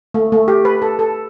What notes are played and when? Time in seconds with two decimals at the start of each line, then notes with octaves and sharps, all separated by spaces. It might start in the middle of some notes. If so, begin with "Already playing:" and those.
0.14 A3
0.32 A3
0.48 G4
0.65 B4
0.82 A4
0.99 A4